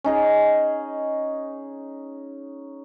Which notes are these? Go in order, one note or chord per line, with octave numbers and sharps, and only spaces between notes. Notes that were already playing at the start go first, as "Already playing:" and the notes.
C#4 D#4 G#4